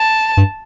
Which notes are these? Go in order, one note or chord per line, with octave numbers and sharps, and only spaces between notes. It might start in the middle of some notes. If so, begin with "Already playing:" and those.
Already playing: A5
G2